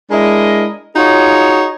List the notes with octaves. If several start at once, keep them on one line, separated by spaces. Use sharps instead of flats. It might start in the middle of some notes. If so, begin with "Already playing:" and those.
G#3 D4 E4 A#4 D#5
D#4 F4 F#4 G#4 C#5